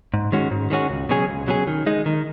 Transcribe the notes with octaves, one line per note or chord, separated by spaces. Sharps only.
G#2
D#3 G#3 C#4 F#4
G#2
D#3 G#3 C#4 F#4
C#2
B2 F#3 C#4 G#4
C#2
B2 F#3 C#4 G#4
D#3
G#3 D#4
D#3